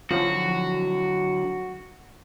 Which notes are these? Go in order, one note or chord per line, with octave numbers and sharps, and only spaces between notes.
D3 F3 F#3 F#4